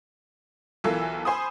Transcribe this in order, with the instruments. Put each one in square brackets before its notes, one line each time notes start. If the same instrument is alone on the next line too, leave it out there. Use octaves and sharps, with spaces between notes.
[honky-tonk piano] B1 E3 F4 A4 A#4 E6
C5 G#5 B5 D#6